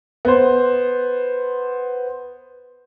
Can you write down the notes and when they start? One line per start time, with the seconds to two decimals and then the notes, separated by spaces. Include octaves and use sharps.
0.25 B3 C5